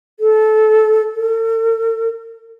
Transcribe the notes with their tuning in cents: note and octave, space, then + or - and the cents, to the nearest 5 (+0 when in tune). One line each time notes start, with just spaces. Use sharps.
A4 -20
A4 +45